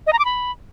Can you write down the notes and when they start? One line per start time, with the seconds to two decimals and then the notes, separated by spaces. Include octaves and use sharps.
0.07 D#5
0.13 A#5
0.19 D6
0.25 B5